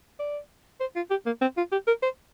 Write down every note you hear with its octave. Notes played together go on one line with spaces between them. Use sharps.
D5
C5
F4
G4
A#3
C4
F4
G4
A#4
C5